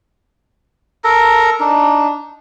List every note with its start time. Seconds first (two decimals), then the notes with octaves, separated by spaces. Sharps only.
1.04 A4 A#4 A#5
1.60 D4 D#4